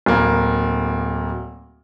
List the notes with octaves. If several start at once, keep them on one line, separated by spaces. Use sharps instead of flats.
D1 A#3